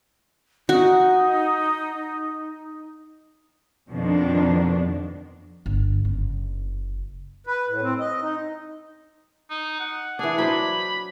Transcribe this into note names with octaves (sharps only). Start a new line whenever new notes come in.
D#4 F#4
F2 B2 D#3 F3 D4
G1
F#1
B4
A2
C4
D#5
D#4
D#4
F#5
E3 D4 G#4
F#3 D4 C5 B5